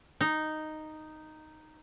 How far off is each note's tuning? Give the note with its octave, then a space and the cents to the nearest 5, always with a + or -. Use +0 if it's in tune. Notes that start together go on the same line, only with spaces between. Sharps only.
D#4 -5